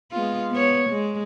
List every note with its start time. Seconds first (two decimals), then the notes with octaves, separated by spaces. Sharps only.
0.12 G#3 B3 F4
0.51 B3 C#5
0.90 G#3